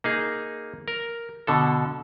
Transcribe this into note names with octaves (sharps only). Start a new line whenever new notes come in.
A#3 D#4 G#4
A#4
B2 D3 A4